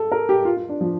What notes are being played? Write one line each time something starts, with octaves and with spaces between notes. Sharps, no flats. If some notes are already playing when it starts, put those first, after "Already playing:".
Already playing: A4
A#4
G4
F4
F4
D4
F3